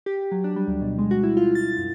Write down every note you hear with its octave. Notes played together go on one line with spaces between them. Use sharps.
G4
F#3
D4
G3
D2
B2
G#3
F#4
E4
F4
A6
F#2